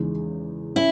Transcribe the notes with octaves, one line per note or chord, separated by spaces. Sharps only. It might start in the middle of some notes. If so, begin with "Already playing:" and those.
Already playing: E2 C#3 G#3 D#4
C#4 E4